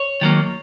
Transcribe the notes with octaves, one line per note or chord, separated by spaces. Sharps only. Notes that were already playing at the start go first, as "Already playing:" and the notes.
Already playing: C#5
D#3 F#3 A#3